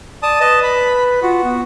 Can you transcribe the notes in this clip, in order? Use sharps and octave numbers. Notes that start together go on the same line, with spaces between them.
D5 A5 D#6
B4 D#5 A5
B5
F4 F#4
B3